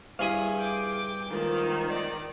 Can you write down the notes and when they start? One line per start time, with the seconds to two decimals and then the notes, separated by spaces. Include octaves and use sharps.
0.19 G2 E4 G#4 F5 D#6
0.58 G5 D6
1.31 G#2 D#3 F3 A#3
1.86 D#4 D5